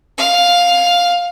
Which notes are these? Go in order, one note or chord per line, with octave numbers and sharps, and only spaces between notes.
F5